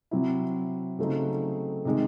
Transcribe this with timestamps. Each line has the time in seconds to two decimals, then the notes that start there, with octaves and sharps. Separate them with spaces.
0.11 C3 F#3 C4 E4
0.99 C#3 F#3 A3 C4 D#4
1.85 C3 D#3 G#3